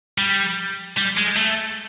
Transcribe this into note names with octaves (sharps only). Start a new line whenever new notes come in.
G3
G3
G#3
A3